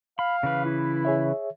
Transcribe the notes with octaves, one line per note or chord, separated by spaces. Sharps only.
F5 B5
C#3 E3 B4
E4
G#4 C#5 E5